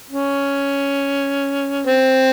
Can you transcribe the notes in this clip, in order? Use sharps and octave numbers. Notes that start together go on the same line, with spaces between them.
C#4
C4